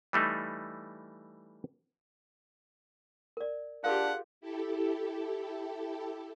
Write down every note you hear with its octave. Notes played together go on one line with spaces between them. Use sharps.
E3 G3 A3 D#4
A#4 D5
D4 F4 G4 G#4 A#4 F5 F#5
E4 G4 A4